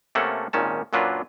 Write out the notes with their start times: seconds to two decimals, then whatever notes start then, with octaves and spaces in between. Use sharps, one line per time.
0.15 C3 A3 A#3 C#4 A4 F#5
0.53 G#1 A#2 D#3 C#4 A5
0.93 F#2 A#2 F#3 D4 F4 B4